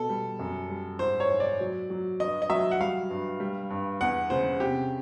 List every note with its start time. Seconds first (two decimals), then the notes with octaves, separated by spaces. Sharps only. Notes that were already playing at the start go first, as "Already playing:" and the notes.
Already playing: B2 A4
0.09 G3
0.39 F#2
0.70 G3
0.99 G#2 C5
1.20 C#5
1.29 G#2
1.40 D5
1.60 F#3
1.90 F#3
2.20 G2 D#5
2.42 D#5
2.50 F#3 E5
2.71 F#5
2.80 G3 F5
3.10 G2
3.40 G3
3.70 G2
4.01 E2 F#5
4.30 C#3 C5
4.60 C3 G4